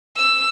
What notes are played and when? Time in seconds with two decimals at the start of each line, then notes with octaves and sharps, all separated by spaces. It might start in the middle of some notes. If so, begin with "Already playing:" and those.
0.17 E6